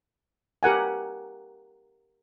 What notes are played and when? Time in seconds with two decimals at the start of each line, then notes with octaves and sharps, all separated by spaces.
0.63 G4 A#4 F#5 G#5